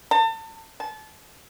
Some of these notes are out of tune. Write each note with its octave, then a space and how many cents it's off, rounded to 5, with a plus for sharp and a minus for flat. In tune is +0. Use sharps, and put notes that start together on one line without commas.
A5 +30
A5 -30